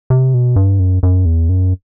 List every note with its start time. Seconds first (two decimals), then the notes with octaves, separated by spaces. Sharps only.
0.10 C3
0.34 B2
0.56 G2
0.79 F#2
1.03 F#2
1.25 E2
1.49 F#2